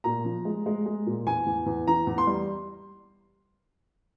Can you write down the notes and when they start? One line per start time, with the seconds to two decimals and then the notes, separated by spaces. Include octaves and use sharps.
0.04 A#2 A#5
0.25 F3
0.45 G#3
0.66 G#3
0.86 G#3
1.06 A#2
1.27 E2 G#5
1.46 E2
1.66 E2
1.87 E3 A#5
2.07 E2
2.18 C6
2.27 G3